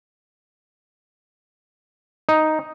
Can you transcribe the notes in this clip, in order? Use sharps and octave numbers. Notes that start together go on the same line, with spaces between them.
D#4